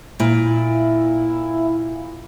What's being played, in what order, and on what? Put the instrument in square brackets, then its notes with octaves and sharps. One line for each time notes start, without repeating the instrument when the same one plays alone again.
[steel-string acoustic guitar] A#2 [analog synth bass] E4